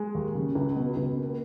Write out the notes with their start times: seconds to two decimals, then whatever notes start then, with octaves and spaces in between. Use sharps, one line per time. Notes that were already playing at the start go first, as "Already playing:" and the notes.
Already playing: G#3
0.15 D#2
0.35 C#3
0.55 C#2
0.76 B2
0.96 C#2
1.17 A#3